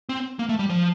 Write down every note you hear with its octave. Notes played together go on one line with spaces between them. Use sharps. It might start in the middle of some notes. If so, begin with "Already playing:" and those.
C4
A#3
A3
G3
F3